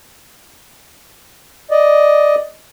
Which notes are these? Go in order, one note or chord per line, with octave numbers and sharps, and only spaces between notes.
D5 D#5